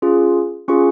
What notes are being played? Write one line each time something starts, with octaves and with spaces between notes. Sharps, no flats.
C#4 F4 G#4
C#4 F4 G#4 C#6